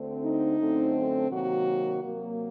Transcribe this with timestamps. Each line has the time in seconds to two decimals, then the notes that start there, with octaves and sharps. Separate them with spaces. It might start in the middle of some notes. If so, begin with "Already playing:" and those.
Already playing: D2 D3 A3 C4
0.24 D#4
0.60 F#2 D3 A3 C4
1.29 C3 D#3 F#3 A#3 F#4
2.01 C3 F#3 A#3